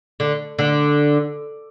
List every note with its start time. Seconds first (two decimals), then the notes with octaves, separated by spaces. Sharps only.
0.20 D3
0.59 D3